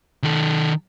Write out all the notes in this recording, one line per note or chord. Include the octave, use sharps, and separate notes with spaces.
D#3 A4